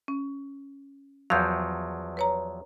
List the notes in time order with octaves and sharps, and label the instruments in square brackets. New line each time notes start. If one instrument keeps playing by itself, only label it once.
[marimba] C#4
[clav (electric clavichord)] E2 F3 F#3 [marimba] F5 G6
[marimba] B4 C#5 A#5